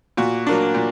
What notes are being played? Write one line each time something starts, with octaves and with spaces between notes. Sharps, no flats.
A#2 F#4
F#3 A#3 D4
A#2